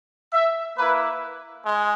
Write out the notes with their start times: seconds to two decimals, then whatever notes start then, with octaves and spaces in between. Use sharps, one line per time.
0.32 E5
0.77 A#3 E4 B4
1.65 G#3